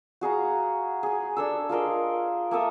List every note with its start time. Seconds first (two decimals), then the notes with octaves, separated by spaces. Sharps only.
0.21 F#4 G#4 F5 A#5
1.03 G#4 G#5
1.37 D4 A4 E6
1.69 F4 G#4 A#4 D#5
2.51 A#3 A4 E5 D#6